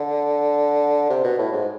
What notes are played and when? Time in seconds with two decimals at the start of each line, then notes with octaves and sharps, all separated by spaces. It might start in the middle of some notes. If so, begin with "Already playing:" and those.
Already playing: D3
1.10 C3
1.24 B2
1.39 A2
1.52 G#2